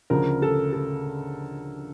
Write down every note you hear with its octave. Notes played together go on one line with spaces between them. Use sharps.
D2 C#3 F3 A#4
A4
A4